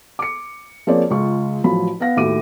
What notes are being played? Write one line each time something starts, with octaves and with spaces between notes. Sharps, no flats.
D6 C#7
F3 A#3 C4 G#4 C#5 D5
C#2 G#3 F4 C#6
A1 F3 F#3 B5
B3 F5 F#5 A#6
D#2 A2 F#4 D6 D#7